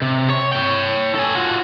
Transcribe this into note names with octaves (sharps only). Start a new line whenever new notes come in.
C3
C#5
C#5 G5
A4 G#5
F4 F#4